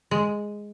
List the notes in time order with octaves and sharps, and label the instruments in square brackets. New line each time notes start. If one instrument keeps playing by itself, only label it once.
[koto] G#3